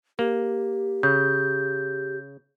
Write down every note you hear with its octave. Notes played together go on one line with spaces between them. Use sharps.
A#3 G4
C#3 G6